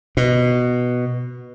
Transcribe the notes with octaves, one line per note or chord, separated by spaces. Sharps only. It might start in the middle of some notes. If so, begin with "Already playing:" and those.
B2